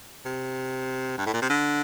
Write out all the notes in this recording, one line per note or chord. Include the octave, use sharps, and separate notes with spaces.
C3
G2
A2
A#2
C3
D3